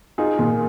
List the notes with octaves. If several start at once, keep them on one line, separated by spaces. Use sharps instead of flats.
D#4 F4 G#4
A#2